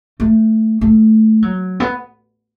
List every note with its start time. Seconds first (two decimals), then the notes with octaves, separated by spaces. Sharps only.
0.20 A3
0.81 A3
1.42 F#3
1.80 B3